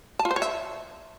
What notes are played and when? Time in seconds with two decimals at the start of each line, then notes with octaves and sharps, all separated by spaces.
0.19 A5
0.25 F4
0.31 C5
0.36 C#5
0.42 E5